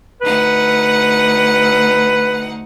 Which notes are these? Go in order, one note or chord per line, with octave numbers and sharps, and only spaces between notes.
D2 D#4 B4 F#5